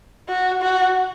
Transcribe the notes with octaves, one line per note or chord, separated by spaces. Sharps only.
F#4
F#4